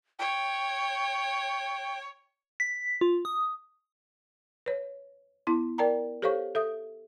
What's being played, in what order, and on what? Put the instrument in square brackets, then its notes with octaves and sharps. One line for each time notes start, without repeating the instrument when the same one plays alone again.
[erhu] C#5 [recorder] G5
[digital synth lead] B6
F4
D#6
[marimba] B4 C#5
B3 E4 C6
A#4 D5 G5 A5 A#5
G4 A4 C5 C#5 F5 C#6
A4 E5 D#6